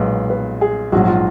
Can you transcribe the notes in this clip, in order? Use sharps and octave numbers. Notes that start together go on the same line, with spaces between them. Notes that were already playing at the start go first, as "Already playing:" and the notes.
Already playing: B1 A#2 G#3 B3
B4
G#4
A#1 G#2 F#3 F#4
F4